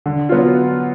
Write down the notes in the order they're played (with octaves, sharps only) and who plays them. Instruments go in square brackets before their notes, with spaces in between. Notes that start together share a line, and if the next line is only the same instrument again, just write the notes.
[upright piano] D3
F#3 B3 F4